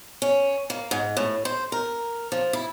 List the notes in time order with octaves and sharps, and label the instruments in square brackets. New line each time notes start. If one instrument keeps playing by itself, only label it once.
[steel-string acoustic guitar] C#4
A#3
G#2
A2
C5
A#4
F3
E4